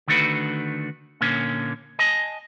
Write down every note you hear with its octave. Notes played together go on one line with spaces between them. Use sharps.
D3 D#3 A3 D4 F#4 B4
A#2 D3 A#3 C#4
D#5 G#5 A5